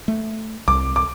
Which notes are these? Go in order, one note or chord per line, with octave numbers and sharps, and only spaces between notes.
A3
C2 D6
D6